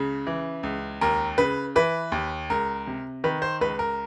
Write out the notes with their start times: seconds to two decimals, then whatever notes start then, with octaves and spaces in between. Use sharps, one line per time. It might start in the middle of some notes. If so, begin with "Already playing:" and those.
Already playing: C#2 C#3
0.27 E3
0.63 C#2
1.01 D#2 A#4
1.38 C#3 B4
1.76 E3 B4
2.12 D#2
2.50 C#2 A#4
2.87 C3
3.24 D#3 B4
3.42 C5
3.61 C#2 B4
3.79 A#4